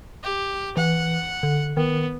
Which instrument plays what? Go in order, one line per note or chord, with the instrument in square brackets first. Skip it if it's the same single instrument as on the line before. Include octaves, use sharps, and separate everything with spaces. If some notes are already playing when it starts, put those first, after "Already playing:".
[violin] G4
[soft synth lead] E3 [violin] F#5
[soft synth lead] D3
[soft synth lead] D#3 [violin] B3